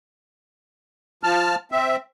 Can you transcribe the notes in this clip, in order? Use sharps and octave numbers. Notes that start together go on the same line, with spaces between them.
F3 A5 F6
C4 E5